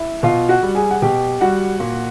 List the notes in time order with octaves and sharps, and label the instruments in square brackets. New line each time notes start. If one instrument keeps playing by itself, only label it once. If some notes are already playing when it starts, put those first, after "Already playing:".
Already playing: [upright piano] E4 E5
B2 F4 F5
F#4 F#5
G3
G#4 G#5
F#5
B2 G4 G5
G3 F#4 F#5
A#2